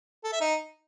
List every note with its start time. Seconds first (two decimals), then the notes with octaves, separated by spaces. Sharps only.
0.24 A4
0.33 E5
0.41 D#4